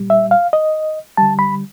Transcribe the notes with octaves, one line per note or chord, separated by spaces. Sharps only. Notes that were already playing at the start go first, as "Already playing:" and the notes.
Already playing: A#2 G3
E5
F5
D#5
D3 G3 A5
B5